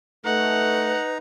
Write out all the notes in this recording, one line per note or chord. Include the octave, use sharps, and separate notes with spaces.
A3 D#4 B4 F#5 A#5